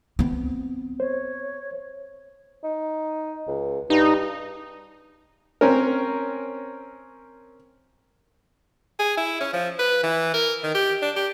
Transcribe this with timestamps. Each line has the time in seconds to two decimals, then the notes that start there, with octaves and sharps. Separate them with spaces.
0.19 B3 C4
1.00 C5 C#5
2.64 D#4
3.48 C#2
3.90 G2 D#4
5.61 C4 C#4 A#4
9.00 G#4
9.18 E4
9.41 C#4
9.53 F3
9.79 B4
10.04 E3
10.34 A#4
10.64 D#3
10.75 G4
11.02 D4
11.16 G4